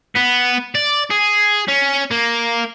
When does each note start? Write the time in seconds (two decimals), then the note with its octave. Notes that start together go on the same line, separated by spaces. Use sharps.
0.16 B3
0.75 D5
1.10 G#4
1.68 C#4
2.11 A#3